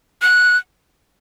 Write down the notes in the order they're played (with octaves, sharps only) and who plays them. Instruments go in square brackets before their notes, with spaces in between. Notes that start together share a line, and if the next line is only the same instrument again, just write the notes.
[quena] F#6